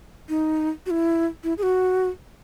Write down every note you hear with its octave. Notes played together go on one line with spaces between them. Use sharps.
D#4
F#4
E4
E4
G#4
F#4